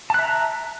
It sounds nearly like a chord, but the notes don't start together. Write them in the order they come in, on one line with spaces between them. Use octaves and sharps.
A5 F#6 E5 A#5